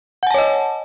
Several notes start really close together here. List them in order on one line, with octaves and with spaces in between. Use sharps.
F#5 G#5 A5 C#5 D#5